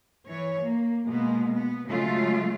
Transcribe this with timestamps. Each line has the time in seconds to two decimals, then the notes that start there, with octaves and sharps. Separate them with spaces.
0.27 E3 C#5
0.63 A#3
1.06 B2 G#3 A#3 B3
1.54 B3
1.87 C#3 F#3 G#3 A3 F4